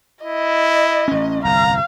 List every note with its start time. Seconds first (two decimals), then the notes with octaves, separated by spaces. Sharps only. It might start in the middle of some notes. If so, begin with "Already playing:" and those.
0.24 E4 D#5
1.08 A1 C#4
1.45 G1 C2 F2 F5 A#5